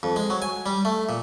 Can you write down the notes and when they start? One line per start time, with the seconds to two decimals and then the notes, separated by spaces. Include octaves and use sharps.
0.03 F2
0.16 G#3
0.30 F#3
0.42 G#5
0.66 G3
0.85 A3
1.09 A#2